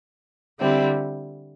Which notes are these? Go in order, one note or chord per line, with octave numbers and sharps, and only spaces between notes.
D3 G3 C4 E4